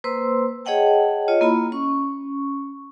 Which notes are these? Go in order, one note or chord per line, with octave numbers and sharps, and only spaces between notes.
A#3 B4 C5 C6 E6
G#4 C#5 D#5 F#5 G5 A5
F4 C#5 D#5
A#3 E4 F4 B5
C#4 C#6